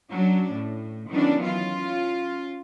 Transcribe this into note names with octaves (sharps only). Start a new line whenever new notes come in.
F#3 C#4 D4
A2
D#3 E3 F#3 B3 C#4 D4
C#4 F4